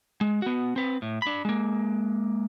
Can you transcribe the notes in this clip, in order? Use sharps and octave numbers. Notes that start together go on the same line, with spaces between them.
G#3
B3 F#4
C4 B4
A2
D4 B5
G#3 A#3